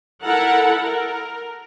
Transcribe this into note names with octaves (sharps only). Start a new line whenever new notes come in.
E4 A4 A#4 F#5
A#4